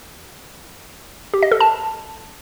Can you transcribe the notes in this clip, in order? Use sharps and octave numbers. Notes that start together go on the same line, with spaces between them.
G4
D#5
A4
A5